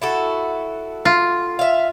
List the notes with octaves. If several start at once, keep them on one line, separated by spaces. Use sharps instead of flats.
E4 F#4 A4
F4
E5 F5